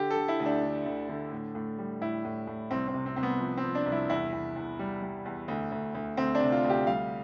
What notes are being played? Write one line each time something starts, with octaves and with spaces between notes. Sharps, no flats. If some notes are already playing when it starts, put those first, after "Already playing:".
Already playing: D3 G4
A4
D3
E4
D2
D4
D3
D2
D3
A2
A2
G3
A2 E4
A2
A2
C2 C4
C4
C3
C4
C2 C4
B3
F3
C4
F3
D4
C2
E4
E2 E4
E2
E2
G3
G3
E2
D2
D2
D2
D2 C4
D4
C3
F4
D2
G4
G3 F5